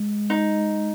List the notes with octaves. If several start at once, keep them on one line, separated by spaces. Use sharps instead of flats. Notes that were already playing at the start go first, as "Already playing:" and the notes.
Already playing: G#3
D#4